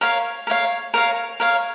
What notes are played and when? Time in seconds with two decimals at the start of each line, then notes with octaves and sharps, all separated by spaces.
0.01 A#4 C#5 F5
0.47 A#4 C#5 F5
0.94 A#4 C#5 F5
1.40 A#4 C#5 F5